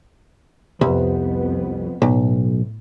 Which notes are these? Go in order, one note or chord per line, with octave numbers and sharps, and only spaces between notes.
C2 F2 B3
B1 A2